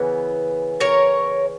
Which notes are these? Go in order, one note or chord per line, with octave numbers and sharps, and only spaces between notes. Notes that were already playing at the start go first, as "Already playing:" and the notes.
Already playing: C#3 E3 B3
A#4 C#5